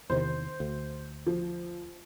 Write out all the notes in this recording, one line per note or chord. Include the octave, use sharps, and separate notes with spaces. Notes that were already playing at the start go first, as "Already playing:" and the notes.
E2 C3 D#3 C5
D2
F3